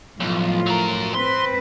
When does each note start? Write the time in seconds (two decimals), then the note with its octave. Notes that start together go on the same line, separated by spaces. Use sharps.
0.20 B1 A2 F3 F4
0.67 F#3 A#4
1.15 C4 B4 C6